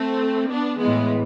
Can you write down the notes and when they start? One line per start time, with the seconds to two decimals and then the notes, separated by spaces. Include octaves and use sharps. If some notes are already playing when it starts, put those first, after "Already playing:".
Already playing: A3 C4
0.50 B3 D4
0.79 A2 E3 G#3 B3